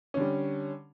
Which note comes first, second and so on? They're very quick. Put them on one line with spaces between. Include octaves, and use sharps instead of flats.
C#4 D3 G3